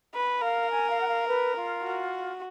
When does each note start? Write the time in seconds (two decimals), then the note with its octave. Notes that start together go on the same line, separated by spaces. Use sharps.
0.14 B4
0.41 A#4 F5
0.70 G#5
0.90 F5
1.01 F#5
1.08 F5
1.27 B4
1.56 F4
1.84 F#4